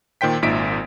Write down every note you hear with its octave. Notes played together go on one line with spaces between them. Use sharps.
A#2 D#3 C5 G5 B6
G#1 A#2 D#4 E5 B6 D7